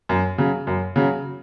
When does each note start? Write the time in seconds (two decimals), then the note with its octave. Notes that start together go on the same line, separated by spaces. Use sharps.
0.09 F#2
0.38 C#3 F#3
0.67 F#2
0.96 C#3 F#3